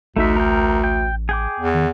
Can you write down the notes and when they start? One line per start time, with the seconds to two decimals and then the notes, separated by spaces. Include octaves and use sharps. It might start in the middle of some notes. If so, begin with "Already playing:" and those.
0.16 A1 D2 A3 D#4 E5
0.36 A#4 G5
0.84 G5
1.29 G#4 G5 D6
1.60 E2
1.74 D#3